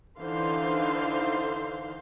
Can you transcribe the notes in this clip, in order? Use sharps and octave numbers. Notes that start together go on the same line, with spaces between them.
D3 E3 D#4 C5 F5 C6